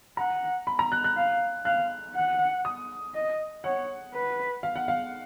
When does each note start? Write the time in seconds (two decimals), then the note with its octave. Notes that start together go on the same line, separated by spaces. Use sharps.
0.17 F#5 A#5
0.67 B5
0.79 A#5
0.92 F#6
1.04 F#6
1.17 F5
1.65 F5 F#6
2.15 F#5
2.65 D#6
3.14 D#5
3.64 C#5 F#5
4.14 B4
4.63 F5
4.76 F#5
4.88 F5